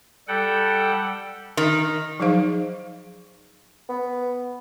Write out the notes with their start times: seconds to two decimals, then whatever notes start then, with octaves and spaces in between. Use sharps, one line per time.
0.28 G3 A4 F#5 G5
1.57 D#3
2.20 F3 F#3 D#4 G#4 C5 F5
3.89 B3